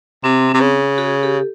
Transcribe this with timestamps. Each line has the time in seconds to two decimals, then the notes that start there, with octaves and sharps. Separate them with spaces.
0.24 C3 C4
0.49 C4
0.54 C3
0.61 C#3
0.98 F#4 G#4
1.23 G4 A4